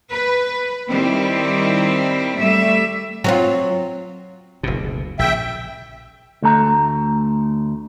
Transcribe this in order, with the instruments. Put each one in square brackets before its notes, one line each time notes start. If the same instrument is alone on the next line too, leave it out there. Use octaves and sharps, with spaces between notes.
[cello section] B4
D#3 G3 C4 E4
G3 A3 E5
[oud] F#3 C4 F4
[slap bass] F#1 D2 B2
[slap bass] A#1 C#3 [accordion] E5 G5
[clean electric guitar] D2 A3 A#5